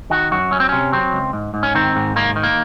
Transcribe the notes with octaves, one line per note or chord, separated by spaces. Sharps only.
D#3 F#4
F#2 F#4
F#3 C#4
C4
C3 C#4
F#3 C4
C#2
G#2
G#2
C#4
D#3 C4
G#2
D#3 A#3
D#3
A#3